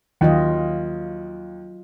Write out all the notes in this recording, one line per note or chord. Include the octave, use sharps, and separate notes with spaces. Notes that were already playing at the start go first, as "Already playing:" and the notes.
D#2 F#3 F4 D#5